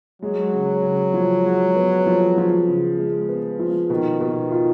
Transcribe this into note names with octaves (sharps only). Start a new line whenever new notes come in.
F#3 G#3
C#3
C#3
F3
G#3
B3
F3
F3
C#3
G#3
B3
F3
B2 D#3
B2
F4